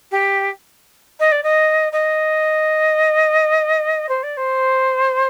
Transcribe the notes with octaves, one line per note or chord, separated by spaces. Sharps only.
G4
D#5
D5
D#5
D#5
C5
D5
C5